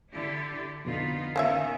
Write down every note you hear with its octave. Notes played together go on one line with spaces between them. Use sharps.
D3 E4 G4
F2 B2 D3 B3 D#4 F4
D#3 A#3 B3 C#4 E5